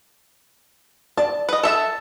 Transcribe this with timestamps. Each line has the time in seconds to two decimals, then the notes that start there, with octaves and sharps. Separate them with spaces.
1.17 D5 A5
1.49 B4 D#5
1.63 A4 E5 A5